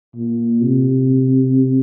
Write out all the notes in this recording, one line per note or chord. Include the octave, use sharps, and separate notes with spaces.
A#2
C3